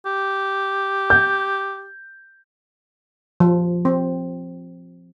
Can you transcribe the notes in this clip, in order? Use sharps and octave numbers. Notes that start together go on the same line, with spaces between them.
G4
G6
F3
C4